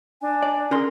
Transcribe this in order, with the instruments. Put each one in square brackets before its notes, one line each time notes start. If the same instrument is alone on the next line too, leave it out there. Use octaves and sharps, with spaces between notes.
[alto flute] D4 [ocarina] G#5
[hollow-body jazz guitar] D5
[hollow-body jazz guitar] D3 A#4 C6 [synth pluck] C#4 G#4